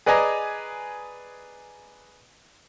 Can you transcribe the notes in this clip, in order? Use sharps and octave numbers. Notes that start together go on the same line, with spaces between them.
G#4 B4 D5 D#5 G#5 A#5